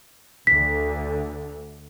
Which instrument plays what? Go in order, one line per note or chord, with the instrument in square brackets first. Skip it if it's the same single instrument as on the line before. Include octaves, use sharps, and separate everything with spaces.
[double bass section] D2 D3 [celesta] B6